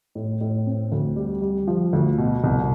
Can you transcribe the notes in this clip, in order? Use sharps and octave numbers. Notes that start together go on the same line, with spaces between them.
A2
A2
C4
D2
G3
G3
F3
D2
B2
C2